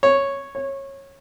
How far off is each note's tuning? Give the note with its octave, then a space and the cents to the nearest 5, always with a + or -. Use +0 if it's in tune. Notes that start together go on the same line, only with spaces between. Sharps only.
C#5 -5
C#5 -20